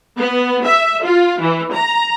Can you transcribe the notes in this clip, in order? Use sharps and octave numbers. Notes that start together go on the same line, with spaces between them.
B3
E5
F4
E3
A#5